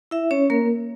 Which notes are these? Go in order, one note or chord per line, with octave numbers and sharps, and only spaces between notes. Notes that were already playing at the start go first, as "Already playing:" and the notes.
E4 E5
C#4 C#5
A#3 A#4